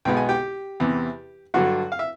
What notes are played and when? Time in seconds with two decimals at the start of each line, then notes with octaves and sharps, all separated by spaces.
0.05 B1 B2 G#3 B3 G5
0.17 G#5
0.29 G4 G5
0.80 E2 C3 E3
1.54 G2 D3 F#3 F#4 F#5
1.92 F5
1.99 E5